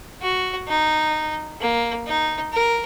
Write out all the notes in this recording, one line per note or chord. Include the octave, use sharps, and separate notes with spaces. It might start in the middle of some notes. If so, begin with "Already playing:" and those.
F#4
D#4
A#3
D#4
A#4